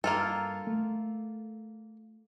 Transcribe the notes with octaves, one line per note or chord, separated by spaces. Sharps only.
G2 A#3 F4 A4
A3